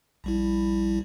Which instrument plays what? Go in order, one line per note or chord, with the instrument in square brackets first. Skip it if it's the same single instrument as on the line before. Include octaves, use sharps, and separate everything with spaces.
[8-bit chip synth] A#1 G3 E4